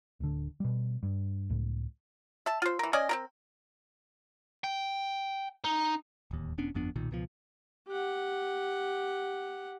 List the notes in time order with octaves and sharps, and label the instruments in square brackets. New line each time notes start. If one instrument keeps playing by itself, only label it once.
[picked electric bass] D1 D3
B2 G3
G2
C#2 A2
[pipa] E5 A5
F4 C5
E3 A#4
C#4 D5 D#5 G#5
C4 D#4 A#4
[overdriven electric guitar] G5
D#4
[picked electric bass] D1 D#2
E1 B3 C#4 D4
G1 F2 B3 D4
B1 A#2 D#3
C#2 B2 F3
[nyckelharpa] G4 F#5